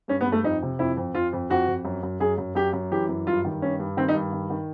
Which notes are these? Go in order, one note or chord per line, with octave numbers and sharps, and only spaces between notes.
G2 C#4
B3
G2
A3
F2 D#4
C3
F2 E4
F2
F2 F4
F2
F2 F#4
F2
F#2
F#2
F#2 G#4
F#2
F#2 G4
F#2
E3 G4
F#2
G2 F4
D#3
G2 C#4
G2
D#3 C4
D#4
G2
D#3
D#3